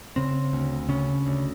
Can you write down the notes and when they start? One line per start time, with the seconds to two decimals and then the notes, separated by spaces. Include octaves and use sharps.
0.16 C#3 C4
0.53 D2
0.89 C#3 C#4
1.27 D2